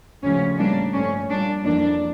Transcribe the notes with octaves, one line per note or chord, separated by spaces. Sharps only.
D2 C#3 F3 A3 C#4
A2 G3 A#3 D4
G2 F3 A3 C#4
A#2 G3 A#3 D4
F2 E3 A#3 D4